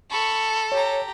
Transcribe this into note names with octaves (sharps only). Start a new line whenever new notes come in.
A4 B5 C#6
G4 C#5 A#5